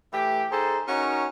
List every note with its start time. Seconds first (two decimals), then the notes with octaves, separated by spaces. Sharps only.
0.13 E3 A3 G4
0.51 D#4 G#4 A4 C5
0.88 C#4 D#4 F#4 A#4 C#5